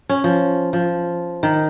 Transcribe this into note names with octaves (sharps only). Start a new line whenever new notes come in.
C#4
F3
F3
D#3